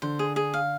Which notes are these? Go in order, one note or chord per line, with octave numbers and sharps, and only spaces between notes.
D3 C5
G#4
G#4
F5